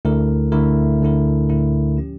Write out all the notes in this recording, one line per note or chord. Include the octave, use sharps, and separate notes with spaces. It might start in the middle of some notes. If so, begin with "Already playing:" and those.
D2 D3 A3 E4 A#4
D2 D3 A3 E4 A#4
D2 D3 A3 E4 A#4
D2 D3 A3 E4 A#4
F3 C#4 G4